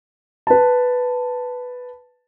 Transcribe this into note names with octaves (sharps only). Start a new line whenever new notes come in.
B4 A5